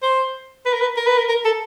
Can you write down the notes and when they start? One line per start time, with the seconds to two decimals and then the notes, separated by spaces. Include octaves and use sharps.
0.03 C5
0.66 B4
0.73 A#4
0.81 B4
0.97 A#4
1.07 B4
1.18 A#4
1.29 A#4
1.45 A4